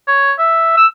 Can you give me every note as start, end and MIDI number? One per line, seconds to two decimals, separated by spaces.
0.08 0.32 73
0.39 0.76 76
0.77 0.86 88